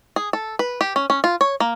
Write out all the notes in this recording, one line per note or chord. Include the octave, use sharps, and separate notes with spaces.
G#4
A4
B4
G4
C#4
C#4
F4
C#5
A#3